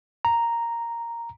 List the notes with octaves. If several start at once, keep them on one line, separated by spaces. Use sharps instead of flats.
A#5